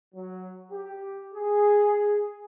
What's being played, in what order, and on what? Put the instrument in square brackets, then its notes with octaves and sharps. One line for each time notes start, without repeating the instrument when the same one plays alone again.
[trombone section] F#3
G4
G#4